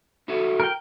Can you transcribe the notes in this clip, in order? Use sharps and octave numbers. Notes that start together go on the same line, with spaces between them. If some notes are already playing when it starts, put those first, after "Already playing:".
E4 F#4 A4
A#4 G5